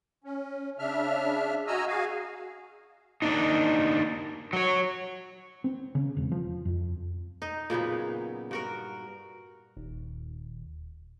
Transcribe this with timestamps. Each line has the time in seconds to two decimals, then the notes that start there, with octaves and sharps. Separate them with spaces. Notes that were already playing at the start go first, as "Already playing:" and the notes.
0.24 C#4
0.79 C#3 D4 E5 F6
1.67 F#4 D#5 G#5 A#5 E6 F6
1.88 F#4 G#4 F5 G#5
3.22 A#3 D4 D#4
4.53 F#3 C#5
5.64 C4
5.95 C#3
6.17 E1
6.32 F3
6.65 F2
7.42 D#4
7.70 A#2 C#3 F#3 B3
8.51 G2 F#4 A#4
9.77 D#1